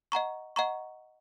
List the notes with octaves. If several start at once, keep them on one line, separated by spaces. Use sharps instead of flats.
D#5 F#5 A#5 C#6
D#5 F#5 A#5 C#6